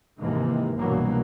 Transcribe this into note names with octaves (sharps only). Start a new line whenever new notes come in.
D#2 G#2 C3 E3 A#3
C2 G2 B2 E3 F#3 A#3